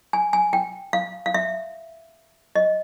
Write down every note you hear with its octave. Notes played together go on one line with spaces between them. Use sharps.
G#5
G#5
G5
F5
F5
E5
D#5